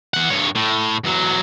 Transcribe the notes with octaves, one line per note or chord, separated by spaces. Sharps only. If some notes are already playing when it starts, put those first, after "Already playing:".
E3 F#5
G2 C#5
A2
E2 F#3